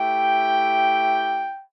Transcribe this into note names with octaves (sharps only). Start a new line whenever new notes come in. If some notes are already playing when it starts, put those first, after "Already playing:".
Already playing: A3 E4 G4 G5